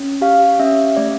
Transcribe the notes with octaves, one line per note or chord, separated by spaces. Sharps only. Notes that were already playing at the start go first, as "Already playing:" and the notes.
Already playing: C#4
G4 F5
C#4 E5
A3 D5